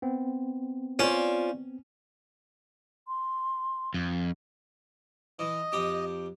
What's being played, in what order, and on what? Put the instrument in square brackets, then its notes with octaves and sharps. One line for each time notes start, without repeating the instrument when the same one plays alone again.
[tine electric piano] B3 C4
[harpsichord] C#4 [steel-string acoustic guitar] F4 C5 D5
[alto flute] C6
[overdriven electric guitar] F2
[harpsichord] E3 [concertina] D#5
[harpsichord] F2 G4 D#6